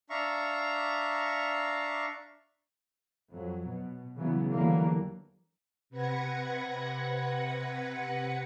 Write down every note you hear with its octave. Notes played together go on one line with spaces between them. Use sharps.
D4 E5 F5 A#5 C#6
F2 F#3
B2
C#3 E3 F#3 B3
E2 D3 E3 F#3 G3 A#3
C3 B4 F#5 G#6 A#6 C#7